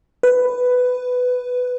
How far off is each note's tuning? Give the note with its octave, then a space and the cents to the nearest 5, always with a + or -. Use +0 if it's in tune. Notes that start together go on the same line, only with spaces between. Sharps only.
B4 +10